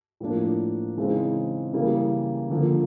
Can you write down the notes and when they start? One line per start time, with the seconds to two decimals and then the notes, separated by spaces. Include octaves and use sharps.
0.20 A2 F3 A#3 D4
0.97 C#3 E3 G#3 C4 D#4
1.73 C#3 E3 G3 A#3
2.50 D3 F3 A#3